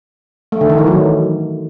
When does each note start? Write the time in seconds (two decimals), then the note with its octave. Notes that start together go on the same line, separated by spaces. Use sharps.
0.52 A3
0.61 D3
0.70 D#3
0.78 E3
0.87 F#3